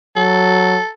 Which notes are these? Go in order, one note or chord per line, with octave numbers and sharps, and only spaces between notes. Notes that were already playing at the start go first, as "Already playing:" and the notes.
F#3 A4